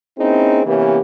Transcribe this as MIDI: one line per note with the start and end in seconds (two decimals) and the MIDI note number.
0.19 0.62 58
0.19 0.62 60
0.19 0.62 61
0.19 0.62 63
0.19 0.62 64
0.19 0.62 68
0.66 0.99 48
0.66 0.99 52
0.66 0.99 58
0.66 0.99 59
0.66 0.99 61
0.66 0.99 67